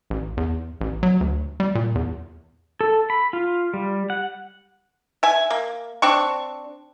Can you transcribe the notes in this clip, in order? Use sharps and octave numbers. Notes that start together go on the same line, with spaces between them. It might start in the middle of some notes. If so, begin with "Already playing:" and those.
A1
E2
A1
F#3
D2
G3
A#2
E2
A4
B5
F4
G3
F#5
E5 G#5
A#3
C4 D4 C#6